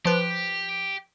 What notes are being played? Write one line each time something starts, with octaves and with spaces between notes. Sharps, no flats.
F3 G4 B4